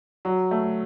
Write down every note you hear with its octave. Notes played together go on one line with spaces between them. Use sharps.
F#3
A3